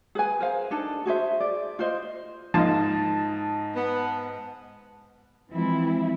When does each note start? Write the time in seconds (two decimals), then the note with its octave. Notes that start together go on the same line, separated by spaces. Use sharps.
0.15 G#4 B4 G#5
0.40 A#4 C5 F5
0.71 D4 D#4 G#4 A4
1.05 F#4 G#4 C5 E5
1.40 D5
1.79 F4 C5 D#5
2.54 G#2 F3 A#3 F4 D#5 A5
3.76 B3
5.50 E3 F3 G#3 C4 E4